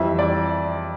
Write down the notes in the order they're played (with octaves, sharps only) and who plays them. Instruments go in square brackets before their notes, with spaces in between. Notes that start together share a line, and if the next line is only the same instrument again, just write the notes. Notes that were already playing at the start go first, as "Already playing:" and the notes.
Already playing: [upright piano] F2 E3 G3 E5
D5